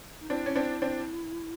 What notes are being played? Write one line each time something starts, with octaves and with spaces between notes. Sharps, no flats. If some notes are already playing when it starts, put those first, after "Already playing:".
D#4
C4 D4 E4
C#4
C4 D4
C4 D4